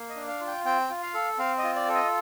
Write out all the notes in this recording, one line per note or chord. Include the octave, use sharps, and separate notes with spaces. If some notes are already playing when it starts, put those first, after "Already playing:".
Already playing: A#3
D#5
D4
F5
F4
G5
C4 G5
F4
F5
A4
C4 F5
D#5
F4
D5
A4
D#5